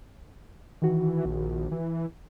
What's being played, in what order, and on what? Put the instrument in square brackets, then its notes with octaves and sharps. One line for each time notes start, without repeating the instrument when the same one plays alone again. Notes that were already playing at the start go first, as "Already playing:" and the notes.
[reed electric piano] D#3 F#4 [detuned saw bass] E3
[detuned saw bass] A#1
E3